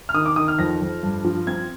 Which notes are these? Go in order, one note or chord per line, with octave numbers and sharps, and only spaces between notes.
F6
D#3 D#6
D6
D#3 D#6
F6
F2 A#6
F2
G2
F3
C4 G#6